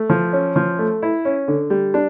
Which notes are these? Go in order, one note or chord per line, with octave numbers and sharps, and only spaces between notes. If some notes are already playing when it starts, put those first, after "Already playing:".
Already playing: A3
F3
C#4
F3
A3
E4
C#4
D3
G3
D4